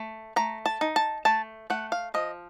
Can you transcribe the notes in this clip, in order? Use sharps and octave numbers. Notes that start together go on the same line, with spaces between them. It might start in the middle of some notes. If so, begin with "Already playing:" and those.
Already playing: A3
A3 A#5
A5
D#4
A5
A3 A5
A3 F#5
F5
F3 D#5